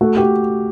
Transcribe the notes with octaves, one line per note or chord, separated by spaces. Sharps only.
A3 F#4
G4
A3